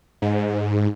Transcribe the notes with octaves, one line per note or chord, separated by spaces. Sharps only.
G#2